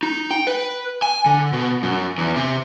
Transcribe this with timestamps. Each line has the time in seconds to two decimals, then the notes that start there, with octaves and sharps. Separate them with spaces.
0.03 D#4
0.31 G5
0.47 B4
1.02 G#5
1.26 D3
1.53 B2
1.83 F#2
2.18 E2
2.36 C3